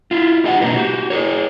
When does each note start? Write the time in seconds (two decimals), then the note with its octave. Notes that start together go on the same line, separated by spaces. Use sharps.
0.11 E4 F4
0.44 D#4 G4 D#5 F5 F#5
0.61 B2 A#3 D4 D#4 G4 B4
0.76 F#4 G4
1.10 G#4 A#4 C#5